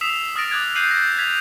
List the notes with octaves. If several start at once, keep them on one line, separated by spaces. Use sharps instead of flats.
D#6 E6 B6 C7 E7 F7
D#6 F6 A6 A#6 D7
D6 D#6 F#6 G#6
F#6 G6 C7 D#7 F#7
G6 A#6
F#6 G#6 B6 F7